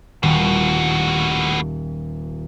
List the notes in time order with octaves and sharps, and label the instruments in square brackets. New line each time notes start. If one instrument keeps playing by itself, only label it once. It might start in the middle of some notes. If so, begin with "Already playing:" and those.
[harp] D#1 [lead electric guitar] A2 F#4